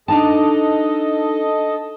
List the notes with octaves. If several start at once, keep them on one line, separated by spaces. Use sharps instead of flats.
D4 D#4 A4 D#5 A5